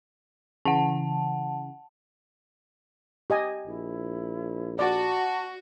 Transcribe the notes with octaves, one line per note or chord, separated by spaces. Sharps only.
C#3 E3 F#5 A5
G4 D#5 G#5
A#1 E4
F#4 D5 A5